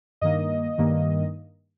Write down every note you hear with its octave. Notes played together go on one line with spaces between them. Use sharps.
G2 D#3 A#3 D#5
G2 D#3 A#3